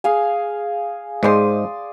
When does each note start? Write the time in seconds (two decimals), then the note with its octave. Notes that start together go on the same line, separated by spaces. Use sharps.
0.04 G#4 F5 G#5
1.23 G#2 G#3 C5 D5 C6 D#6